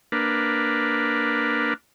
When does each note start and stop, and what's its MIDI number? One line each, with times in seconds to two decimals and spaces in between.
0.12 1.74 58
0.12 1.74 62
0.12 1.74 71